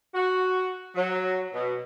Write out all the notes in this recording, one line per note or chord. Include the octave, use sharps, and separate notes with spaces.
F#4
F#3
B2